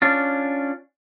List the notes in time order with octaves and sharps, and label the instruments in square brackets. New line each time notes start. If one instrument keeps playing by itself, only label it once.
[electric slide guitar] C#4 D4 F4